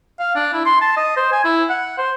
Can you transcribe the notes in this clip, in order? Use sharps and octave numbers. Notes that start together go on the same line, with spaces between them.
F5
D4
E4
C6
A5
D#5
C5
G#5
E4
F#5
C5